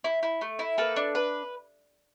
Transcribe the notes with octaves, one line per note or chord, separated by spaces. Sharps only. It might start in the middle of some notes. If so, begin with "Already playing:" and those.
E4
E4
A3
E4
A#3 A4 B4
D4
B4